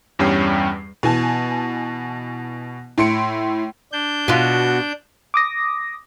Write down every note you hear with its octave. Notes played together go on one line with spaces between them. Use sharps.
E2 G2 G3 C#4 G5 C7
B2 E3 G#5 A5
A2 E4 C6 C#7 D7
D4 G6
B2 F4 F#4
D6 D#6 A#6